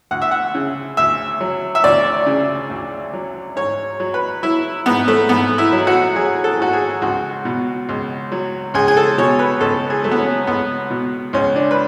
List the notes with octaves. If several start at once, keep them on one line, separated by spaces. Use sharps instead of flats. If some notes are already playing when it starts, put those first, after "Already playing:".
D2 F#5
E5
F#5
C#3
D2 E5
F#3
E5
D2 D5
C#3
D2
F#3
G#2 C#5
F#3
B4
F#3 E4
G#2 B3
A3
G#2 B3
E4
F#3
F#4
F#3 G#4
A4
G#2 F#4
G#4
C#2 F#4
B2
C#2
F#3
C#2 G#4
G#4
A4
B2 C#5
B4
C#2 A4
G#4
F#3 A3
B3
C#4
C#2 B3
B2
C#2 C#4
D4
B4